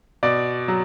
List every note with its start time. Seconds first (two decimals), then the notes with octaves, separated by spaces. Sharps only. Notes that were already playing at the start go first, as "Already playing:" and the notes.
0.23 B2 D5
0.68 F#3